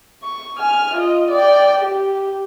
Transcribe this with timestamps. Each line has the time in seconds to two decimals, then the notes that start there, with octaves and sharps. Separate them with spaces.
0.23 C#6
0.58 G#5 F6
0.96 F4 D#5
1.31 D5 G5
1.81 G4